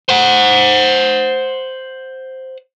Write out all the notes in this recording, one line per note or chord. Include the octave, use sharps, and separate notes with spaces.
C5 F#5